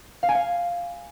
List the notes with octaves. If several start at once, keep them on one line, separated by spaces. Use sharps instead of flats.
F5
G#5
F5